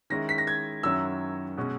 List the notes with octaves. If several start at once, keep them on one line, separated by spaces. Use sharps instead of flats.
D#3 G#3 C#4 E4 A#6
B6
A#6
G#6
F#2 D#3 F#3 C#4 E4 E6
B2 G#3 C#4 F#4